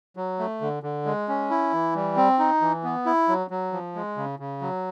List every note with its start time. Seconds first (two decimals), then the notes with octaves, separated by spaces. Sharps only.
0.16 F#3
0.39 A3
0.61 D3
0.83 D3
1.06 G#3
1.28 C#4
1.50 E4
1.73 E3
1.95 G3
2.17 C4
2.39 D#4
2.61 E3
2.84 B3
3.06 E4
3.28 F#3
3.50 F#3
3.72 F3
3.95 G#3
4.17 C#3
4.39 C#3
4.61 F#3